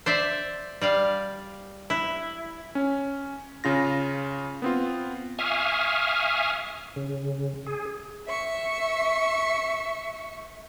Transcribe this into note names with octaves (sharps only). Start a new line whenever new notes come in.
C5 D5 E5
G3 D5 F5
E4
C#4
C#3 F4 A#6
B3 C4 F4
E5 F5 G#5 C#6 D#6 F6
C#3
G#4
E5 C#6